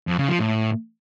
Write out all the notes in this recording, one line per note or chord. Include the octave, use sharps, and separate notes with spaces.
F2
C#3
F3
A2